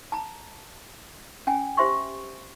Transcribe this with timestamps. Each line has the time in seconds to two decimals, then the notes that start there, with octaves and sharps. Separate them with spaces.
0.12 A5 A#5
1.47 C#4 G5 G#5
1.77 G4 C5 E5 C6 C#6